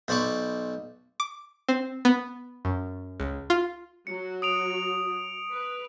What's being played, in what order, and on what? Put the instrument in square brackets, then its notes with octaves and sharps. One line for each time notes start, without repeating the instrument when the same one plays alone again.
[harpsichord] B1 C5 D5 B5 C#6
[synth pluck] D6
C4
B3
F#2
C#2
F4
[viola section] F#3 F#4 [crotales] C#7
[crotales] D#6 D7 F7
[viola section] B4